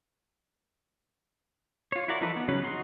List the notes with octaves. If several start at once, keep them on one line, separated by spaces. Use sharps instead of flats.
F4 C#5
E4 F#4 A#4 D5
E3 F3 D#4 A4 B4
B3
C#3 F#3 C#4 B4
D#4 F#4 C6